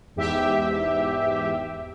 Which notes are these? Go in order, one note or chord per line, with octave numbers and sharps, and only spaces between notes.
E2 G#2 G4 E5